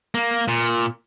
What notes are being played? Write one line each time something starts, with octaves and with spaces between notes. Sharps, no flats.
A#3
A#2